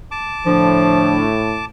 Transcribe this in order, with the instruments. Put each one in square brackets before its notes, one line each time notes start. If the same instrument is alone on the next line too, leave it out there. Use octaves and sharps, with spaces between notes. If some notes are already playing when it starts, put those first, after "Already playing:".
[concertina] A5 D6
[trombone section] A2 [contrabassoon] D3 [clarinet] F3